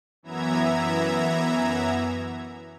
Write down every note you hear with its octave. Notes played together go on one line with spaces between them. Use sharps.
F#2 E3 B3 E5 A#5 G#6